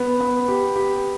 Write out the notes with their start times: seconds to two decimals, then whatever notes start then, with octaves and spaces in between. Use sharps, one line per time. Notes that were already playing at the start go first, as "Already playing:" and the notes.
Already playing: B3
0.20 B3
0.48 G4
0.76 G4